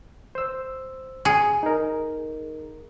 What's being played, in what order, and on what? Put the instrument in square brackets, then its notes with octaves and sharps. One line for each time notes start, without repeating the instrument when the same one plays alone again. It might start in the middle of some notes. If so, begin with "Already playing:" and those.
[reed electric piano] C5 E6
[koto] G#4
[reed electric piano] D#4 A#4